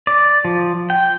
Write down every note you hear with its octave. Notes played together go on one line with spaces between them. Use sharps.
D5
F3
G5